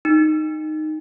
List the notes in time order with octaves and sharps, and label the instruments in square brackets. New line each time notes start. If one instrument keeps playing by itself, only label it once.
[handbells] D#4